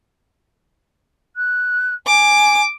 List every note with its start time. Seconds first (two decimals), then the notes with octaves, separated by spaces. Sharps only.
1.36 F#6
2.07 G#5 D6